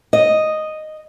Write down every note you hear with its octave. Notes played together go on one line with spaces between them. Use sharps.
D#5